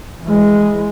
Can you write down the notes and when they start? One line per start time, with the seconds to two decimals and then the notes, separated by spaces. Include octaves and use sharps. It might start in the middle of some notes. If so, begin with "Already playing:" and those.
0.23 E3 G#3